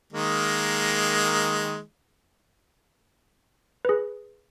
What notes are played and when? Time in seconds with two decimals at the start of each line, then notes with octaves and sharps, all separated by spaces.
0.13 D#3 G#3 A#3
3.85 G#4 B4